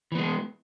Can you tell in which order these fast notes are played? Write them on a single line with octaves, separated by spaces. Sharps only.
E3 B3 G#3